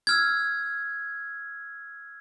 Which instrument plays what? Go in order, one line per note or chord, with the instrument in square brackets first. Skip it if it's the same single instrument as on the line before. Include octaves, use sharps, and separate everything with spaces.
[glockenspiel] E6 F6 G#6